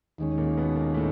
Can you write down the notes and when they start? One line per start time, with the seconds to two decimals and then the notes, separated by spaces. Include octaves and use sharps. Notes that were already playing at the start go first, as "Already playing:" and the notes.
0.18 D#2 D#3 G#3 C#4
0.37 A#2 A#3
0.57 B2 B3
0.75 A#2 A#3
0.94 A2 A3